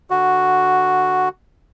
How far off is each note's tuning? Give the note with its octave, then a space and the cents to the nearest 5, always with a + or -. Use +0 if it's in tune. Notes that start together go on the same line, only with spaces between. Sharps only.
D3 +0 F#4 +0